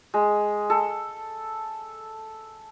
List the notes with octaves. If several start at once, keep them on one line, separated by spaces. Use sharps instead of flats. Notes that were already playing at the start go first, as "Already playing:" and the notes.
G#3
A4